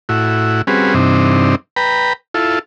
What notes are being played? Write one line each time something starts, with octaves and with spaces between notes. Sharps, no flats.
A2 E4 F#4
G3 C4 C#4 F#4 G#4 B4
G2 C3 E3 C4 D4 D#4
B4 G5 A#5 B5
E4 F4 A4